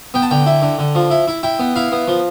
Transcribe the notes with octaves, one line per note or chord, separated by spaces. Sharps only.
B3 G5
A5
D3 G5
E4
D3
D3
F3
E4
E4
E4 G5
B3
E4 F5
B3
F3